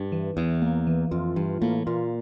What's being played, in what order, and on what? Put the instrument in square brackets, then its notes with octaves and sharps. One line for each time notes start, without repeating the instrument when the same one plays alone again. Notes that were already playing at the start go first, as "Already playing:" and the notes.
Already playing: [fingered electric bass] G2
[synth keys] E3
[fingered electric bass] E2 [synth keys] E3
[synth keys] A#3
E3
[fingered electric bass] F2 [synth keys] F4
[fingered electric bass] G2 [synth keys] E3
[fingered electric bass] A2 [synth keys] A#3
[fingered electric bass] A#2 [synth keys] F4